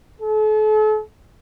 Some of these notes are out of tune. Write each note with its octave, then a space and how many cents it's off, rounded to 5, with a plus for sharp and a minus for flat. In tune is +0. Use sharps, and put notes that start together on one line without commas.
A4 -40